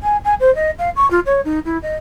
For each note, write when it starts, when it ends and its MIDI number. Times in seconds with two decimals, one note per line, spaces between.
0.02 0.17 80
0.24 0.34 80
0.40 0.53 72
0.55 0.70 75
0.78 0.90 77
0.96 1.08 85
1.10 1.19 65
1.26 1.40 73
1.44 1.59 63
1.65 1.78 64
1.82 1.95 75